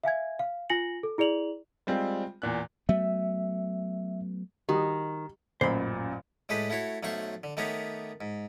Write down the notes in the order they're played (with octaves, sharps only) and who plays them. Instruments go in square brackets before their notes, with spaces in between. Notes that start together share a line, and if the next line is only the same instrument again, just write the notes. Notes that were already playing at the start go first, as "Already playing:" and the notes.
[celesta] E5 F5 G#5 G#6
F5
F4 G#5 A#6 C#7 F#7
A4
E4 G#4 D5 F7 F#7
[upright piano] G3 G#3 C4 F4
E2 A#2 F#6
[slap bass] F#3 A3 B3 [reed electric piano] E5
[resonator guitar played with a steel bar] D#3 [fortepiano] G3 F#4 G4
[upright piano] A1 F#2 A#2 [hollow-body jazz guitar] C5 B5
[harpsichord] A2 G#3 G4 A4 B4
A3 E4 F#4 C#5
B1 F#3 A3 C5 C6 C#6
D3
D#3 A3 B3 G4 A#4 C#5
G#2